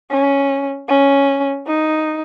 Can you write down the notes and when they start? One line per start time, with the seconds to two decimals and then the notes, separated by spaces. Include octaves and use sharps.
0.11 C#4
0.89 C#4
1.67 D#4